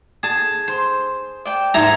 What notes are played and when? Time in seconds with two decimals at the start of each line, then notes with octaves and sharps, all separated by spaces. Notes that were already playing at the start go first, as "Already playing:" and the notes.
0.23 G#4 A5
0.68 C5
1.45 D5 G5 A5
1.74 G#2 E4 G#4 A5 A#5